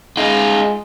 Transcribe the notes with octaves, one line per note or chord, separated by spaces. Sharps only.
G#3 D#4 F4